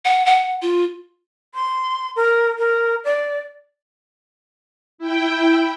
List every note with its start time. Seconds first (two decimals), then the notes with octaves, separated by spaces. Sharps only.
0.05 F#5
0.26 F#5
0.62 F4
1.55 C6
2.16 A#4
2.58 A#4
3.05 D5
4.98 E4 G5